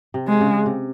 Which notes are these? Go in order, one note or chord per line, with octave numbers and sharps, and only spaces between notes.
C3
G#3
C#3
C3